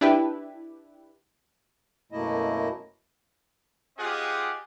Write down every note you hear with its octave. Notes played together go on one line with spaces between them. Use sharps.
D4 E4 G4 B4
F#2 B2 A3 A#3 E4 D#5
C4 F4 G4 G#4 D#5 F#5